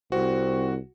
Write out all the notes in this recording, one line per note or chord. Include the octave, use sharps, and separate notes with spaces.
C2 C4 F#4